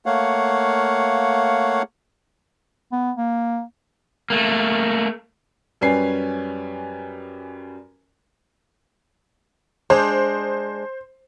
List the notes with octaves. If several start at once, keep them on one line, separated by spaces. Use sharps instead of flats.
A3 A#3 C#5 F5 F#5
B3
A#3
A3 A#3
F#2 G3 C#4 B4 G#5 C7
G#3 D4 C5